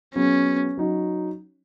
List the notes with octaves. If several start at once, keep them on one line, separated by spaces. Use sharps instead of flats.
F#3 B3 C#4 G#4
F#3 D#4 F#4